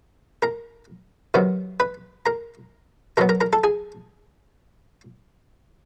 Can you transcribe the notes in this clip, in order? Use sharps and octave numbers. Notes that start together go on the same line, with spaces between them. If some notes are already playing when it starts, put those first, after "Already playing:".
A#4 A#5
C3 D#3 F#3 B3
B4 B5
A#4 A#5
B2 F#3 B3 A#4 A#5
A#4 A#5
A#4 A#5
A4 A5
G#4 G#5